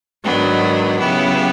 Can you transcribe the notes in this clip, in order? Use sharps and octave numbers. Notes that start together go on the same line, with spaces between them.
G#2 D#3 F#3 B3 D4
C#3 F#3 B3 E4 G4